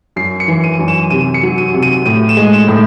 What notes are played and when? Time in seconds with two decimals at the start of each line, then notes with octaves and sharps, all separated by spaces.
0.16 F#2 C7
0.40 C#7
0.48 E3
0.64 D#7
0.79 F#2
0.88 E7
1.10 C3 D#7
1.34 C#7
1.43 F#3
1.58 D#7
1.74 C3
1.83 D#7
2.06 A2 D#7
2.29 E7
2.37 G#3
2.53 E7
2.68 A2